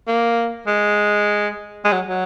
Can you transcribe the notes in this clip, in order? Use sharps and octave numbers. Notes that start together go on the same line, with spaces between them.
A#3
G#3
G#3
F#3
F#3